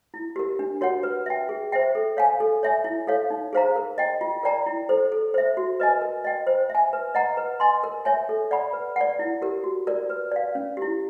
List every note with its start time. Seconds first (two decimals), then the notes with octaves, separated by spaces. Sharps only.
0.14 E4
0.36 G4 A#4
0.59 D4
0.81 F#4 A#4 C#5 F#5
1.03 B4
1.26 E5 G5
1.49 G#4
1.72 C5 E5 G5
1.95 A4
2.17 C#5 F5 G#5
2.40 A4
2.63 C#5 E5 G#5
2.84 E4
3.07 A4 C#5 F5
3.30 D#4
3.53 G#4 C5 F5 A#5
3.76 A#4
3.98 D#5 G5
4.21 F4
4.43 A#4 D5 G5 A#5
4.66 E4
4.89 A4 C5
5.12 A4
5.34 C5 E5
5.57 F#4
5.80 B4 D#5 G#5
6.02 A#4
6.24 D#5 G5
6.47 C5
6.70 E5
6.75 G#5
6.93 B4
7.15 D#5 F#5 A#5
7.37 B4
7.60 D#5 G#5 C6
7.84 A#4
8.05 C#5 E5 G#5
8.29 A4
8.51 D5 F#5 B5
8.73 B4
8.96 D5 F#5
9.19 E4
9.42 G4 A#4
9.64 F#4
9.87 A#4 D5
10.10 B4
10.32 D5 F5
10.55 C#4
10.77 E4 G4